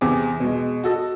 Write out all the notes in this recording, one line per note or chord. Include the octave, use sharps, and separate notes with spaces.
E2 C3 G#4 D6
B2 G#3
F#4 A4 D#5